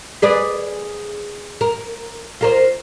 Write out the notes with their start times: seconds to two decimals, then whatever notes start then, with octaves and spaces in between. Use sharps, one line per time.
0.22 G#4 B4 D5
1.61 A#4
2.41 F4 A#4 C5